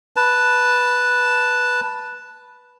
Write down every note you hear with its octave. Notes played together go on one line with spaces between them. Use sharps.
B4 A5